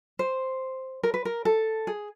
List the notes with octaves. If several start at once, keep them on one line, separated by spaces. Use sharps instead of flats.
C5
A#4
B4
A#4
A4
G#4